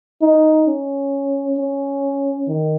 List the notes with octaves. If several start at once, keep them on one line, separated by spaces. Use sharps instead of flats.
D#4
C#4
C#4
D#3